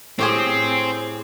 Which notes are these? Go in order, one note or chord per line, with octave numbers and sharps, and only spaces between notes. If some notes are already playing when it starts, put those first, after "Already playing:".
A2 C4 G4 G#4